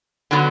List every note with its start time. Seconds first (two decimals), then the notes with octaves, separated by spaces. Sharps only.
0.31 D3 F#3 B3